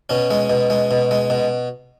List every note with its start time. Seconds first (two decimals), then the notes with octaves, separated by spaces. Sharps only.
0.10 B2 C#4
0.31 G#3
0.50 B2
0.70 G#3
0.91 B2
1.11 G#3
1.30 B2